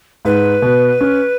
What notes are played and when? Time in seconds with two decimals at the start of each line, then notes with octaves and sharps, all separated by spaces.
0.25 G#2 B4
0.62 B2
1.01 C#4